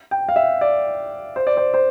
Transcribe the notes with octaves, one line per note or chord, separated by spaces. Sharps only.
G5
F5
E5
D5
C5
D5
C5
C5